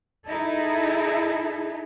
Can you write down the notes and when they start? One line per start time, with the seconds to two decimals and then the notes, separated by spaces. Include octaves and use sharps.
0.27 D#4 E4 G#4 A4